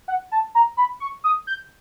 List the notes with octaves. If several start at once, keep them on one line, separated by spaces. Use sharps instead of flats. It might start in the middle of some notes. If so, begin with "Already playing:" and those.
F#5
A5
A#5
B5
C#6
D#6
G6